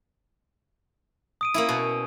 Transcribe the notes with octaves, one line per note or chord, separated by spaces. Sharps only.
D#6 D7 D#7
A#3 C#4 E4
B2